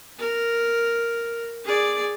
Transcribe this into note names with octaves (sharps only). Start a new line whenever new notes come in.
A#4
G#4 D5